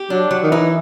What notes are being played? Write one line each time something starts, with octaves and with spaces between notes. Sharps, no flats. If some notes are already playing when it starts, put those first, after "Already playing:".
Already playing: G4
F#3 D4
F#3
D#3
E3 D#4